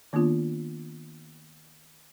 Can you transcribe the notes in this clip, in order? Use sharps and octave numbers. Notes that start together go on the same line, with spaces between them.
D#3 A#3 B3 D4 F4